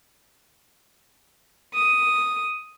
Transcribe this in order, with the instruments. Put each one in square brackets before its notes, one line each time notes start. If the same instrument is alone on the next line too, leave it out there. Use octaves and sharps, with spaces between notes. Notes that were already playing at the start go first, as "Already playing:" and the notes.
[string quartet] D#6